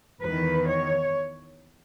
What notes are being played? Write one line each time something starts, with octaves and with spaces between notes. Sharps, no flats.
E2 D#3 B4
C#5